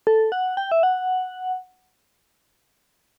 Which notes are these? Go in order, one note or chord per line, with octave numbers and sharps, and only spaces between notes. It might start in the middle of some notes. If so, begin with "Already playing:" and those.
A4
F#5
G5
E5
F#5